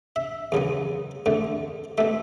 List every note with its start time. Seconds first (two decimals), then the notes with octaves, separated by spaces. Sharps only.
0.16 E5
0.52 E2 C#3 F#3 B3
1.26 E2 D3 A3
1.98 B2 A3 E5